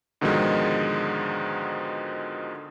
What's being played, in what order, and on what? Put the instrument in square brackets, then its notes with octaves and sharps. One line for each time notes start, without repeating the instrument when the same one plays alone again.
[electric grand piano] G#2 B2 D3 D#3 F3 G#3